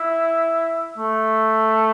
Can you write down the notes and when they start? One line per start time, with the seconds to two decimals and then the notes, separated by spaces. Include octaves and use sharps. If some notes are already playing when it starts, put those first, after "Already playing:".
Already playing: E4
0.98 A3